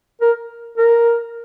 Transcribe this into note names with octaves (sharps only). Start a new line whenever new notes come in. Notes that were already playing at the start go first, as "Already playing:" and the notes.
A#4
A#4